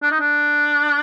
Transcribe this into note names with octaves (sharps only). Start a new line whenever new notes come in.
D4
D#4
D4